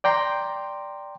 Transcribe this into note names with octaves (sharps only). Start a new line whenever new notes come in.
D5 G5 A#5 C6